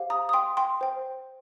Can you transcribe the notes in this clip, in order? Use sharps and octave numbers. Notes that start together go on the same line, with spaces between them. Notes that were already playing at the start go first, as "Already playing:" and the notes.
Already playing: G4 C5 F5
A#5 D#6
D#6
G5 C6
G5 C6
C5 G5